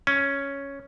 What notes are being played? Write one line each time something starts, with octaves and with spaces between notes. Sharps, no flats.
C#4